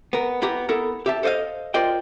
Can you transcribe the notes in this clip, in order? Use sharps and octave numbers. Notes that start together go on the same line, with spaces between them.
B3 A#4
B3 E4 G4 A#5
B3 E4 A4 A#4
G4 E5 A5
A4 C5 D5 D#5 F5
F4 A#4 C5 D5 D#5 G5